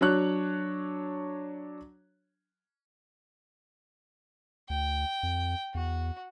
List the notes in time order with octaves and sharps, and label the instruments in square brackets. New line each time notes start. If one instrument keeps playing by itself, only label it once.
[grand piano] F#3 D4 C#5 F#6
[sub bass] D2 [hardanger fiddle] G5
[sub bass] F2
[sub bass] E2 [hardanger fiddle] F#4